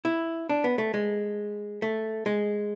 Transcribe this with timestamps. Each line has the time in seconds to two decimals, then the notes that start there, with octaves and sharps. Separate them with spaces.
0.05 E4
0.49 D4
0.64 B3
0.78 A3
0.94 G#3
1.82 A3
2.26 G#3